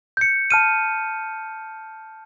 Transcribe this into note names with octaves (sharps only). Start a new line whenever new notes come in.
G6 C#7
A5 F6 D#7